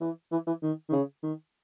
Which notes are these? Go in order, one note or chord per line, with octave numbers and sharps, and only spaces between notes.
E3
E3
E3
D#3
D#3
C#3
D#3